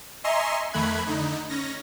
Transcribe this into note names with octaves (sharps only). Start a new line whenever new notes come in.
D#5 E5 G#5 A#5 C6 C#6
F2 D#3 A3 B5 F#6 G#6
D3 D#4
C#4 A#6